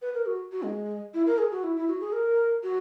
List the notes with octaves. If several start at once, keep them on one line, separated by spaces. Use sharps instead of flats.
B4
A#4
F#4
F#4
G#3
E4
A#4
G#4
F#4
E4
E4
F#4
G#4
A#4
F#4